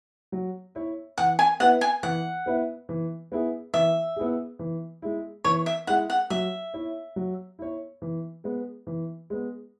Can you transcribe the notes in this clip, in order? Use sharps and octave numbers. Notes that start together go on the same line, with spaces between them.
F#3
E4 C#5 E5
E3 F#5
G#5
B3 E4 B4 E5 F#5
G#5
E3 F#5
B3 E4 B4 E5
E3
B3 E4 G#4
E3 E5
B3 E4 G#4
E3
G#3 E4
E3 C#5
E5
G#3 E4 F#5
F#5
F#3 E5
E4 C#5
F#3
E4 C#5
E3
G#3 B3
E3
G#3 B3